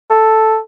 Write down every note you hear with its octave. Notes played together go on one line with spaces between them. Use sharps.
A4